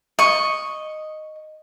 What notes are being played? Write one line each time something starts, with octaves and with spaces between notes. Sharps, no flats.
D#5 C#6